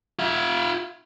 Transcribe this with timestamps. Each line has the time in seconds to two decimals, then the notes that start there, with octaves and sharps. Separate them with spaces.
0.19 F4 E5